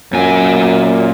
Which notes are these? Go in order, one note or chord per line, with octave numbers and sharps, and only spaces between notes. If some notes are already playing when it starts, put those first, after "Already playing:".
F#2 A#2 G#5